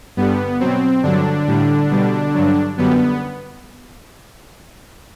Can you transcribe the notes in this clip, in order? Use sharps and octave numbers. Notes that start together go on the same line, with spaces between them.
G2 D3 G3 B3
B2 F#3 C4
G2 D3 F#3 D4
A2 G3
B2 G3
G2 D3 F#3
F#2 D3 G3 B3